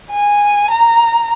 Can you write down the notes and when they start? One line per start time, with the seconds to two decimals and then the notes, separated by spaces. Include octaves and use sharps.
0.11 G#5
0.71 A#5